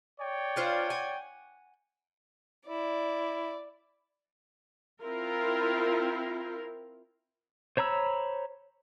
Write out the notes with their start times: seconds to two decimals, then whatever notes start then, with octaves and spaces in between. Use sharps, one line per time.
0.20 C#5 D5 G5
0.56 D4 F4 C5
0.90 F#5 G#5
2.68 E4 D5
5.03 C4 E4 F4 A#4
7.77 C5 C#5 A#5 B5 E6